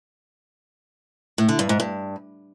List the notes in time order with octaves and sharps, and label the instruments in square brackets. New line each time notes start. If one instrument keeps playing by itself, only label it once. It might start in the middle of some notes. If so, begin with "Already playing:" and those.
[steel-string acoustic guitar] A2
D3
G2
G#2
G2